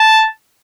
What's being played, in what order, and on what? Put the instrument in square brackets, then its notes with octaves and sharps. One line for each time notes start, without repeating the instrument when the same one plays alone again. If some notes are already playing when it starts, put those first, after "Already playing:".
Already playing: [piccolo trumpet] A5